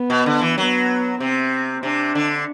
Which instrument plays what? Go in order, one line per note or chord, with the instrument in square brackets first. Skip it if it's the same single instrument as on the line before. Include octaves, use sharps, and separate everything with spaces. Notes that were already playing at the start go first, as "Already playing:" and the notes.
Already playing: [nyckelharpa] B3
[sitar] B2
D3
E3
[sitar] F#3 [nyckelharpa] B3
[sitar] C3 [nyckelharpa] C4
[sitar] C3 [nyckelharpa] D4
[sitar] D3